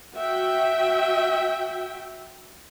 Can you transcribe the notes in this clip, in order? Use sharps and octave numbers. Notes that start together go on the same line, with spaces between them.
F#4 E5 G5